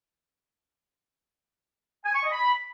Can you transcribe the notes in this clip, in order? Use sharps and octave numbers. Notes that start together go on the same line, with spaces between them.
G#5
C#6
D#5
B5